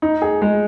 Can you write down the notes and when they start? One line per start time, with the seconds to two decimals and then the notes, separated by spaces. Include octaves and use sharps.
0.02 D#4
0.22 G#4
0.42 G#3